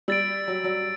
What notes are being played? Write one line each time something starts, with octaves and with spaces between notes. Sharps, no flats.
G3 E6 A6 D7
F#3
F#3